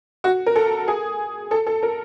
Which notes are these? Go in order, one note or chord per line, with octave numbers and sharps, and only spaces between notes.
F#4
A#4
A4
G#4
A4
A4
A#4